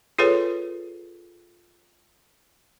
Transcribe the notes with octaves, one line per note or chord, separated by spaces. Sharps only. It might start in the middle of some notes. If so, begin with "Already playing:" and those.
F4 G#4 A4 B4 C#5